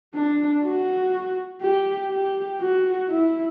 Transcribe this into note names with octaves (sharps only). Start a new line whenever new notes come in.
D4
F#4
G4
G4
F#4
E4